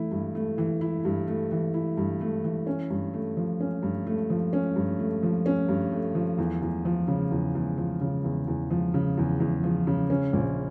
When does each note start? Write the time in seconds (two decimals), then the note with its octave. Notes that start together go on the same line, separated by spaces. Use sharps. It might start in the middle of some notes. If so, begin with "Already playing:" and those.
Already playing: E3 A3 E4
0.11 G2
0.35 A3
0.58 E3
0.81 E4
1.05 G2
1.27 A3
1.52 E3
1.74 E4
1.97 G2
2.21 A3
2.44 E3
2.67 C#4
2.90 G2
3.13 A3
3.37 F3
3.60 C#4
3.83 G2
4.07 A3
4.30 F3
4.53 C#4
4.76 G2
4.99 A3
5.23 F3
5.46 C#4
5.69 G2
5.92 A3
6.15 F3
6.38 E2
6.62 E2
6.85 F3
7.08 C#3
7.31 E2
7.55 E2
7.78 F3
8.01 C#3
8.24 E2
8.48 E2
8.70 F3
8.94 C#3
9.18 E2
9.40 E2
9.63 F3
9.87 C#3
10.10 C#4
10.33 A#1